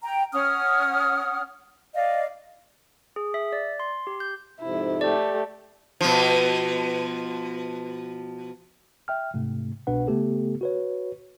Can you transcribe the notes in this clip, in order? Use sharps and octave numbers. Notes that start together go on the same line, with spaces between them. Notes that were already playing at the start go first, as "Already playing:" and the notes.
G5 A#5
C#4 F#5 D#6 F6
D5 D#5 F5
G#4
E5
D5
C6
G4
G6
F2 G#2 C3 E4
A3 G4 D5
B2 F3
E5 G5 F6
G#2 C3 A3
C2 B2 D4 B4 F#5
C#3 A3 B3 G4 A4
F#4 B4 C#5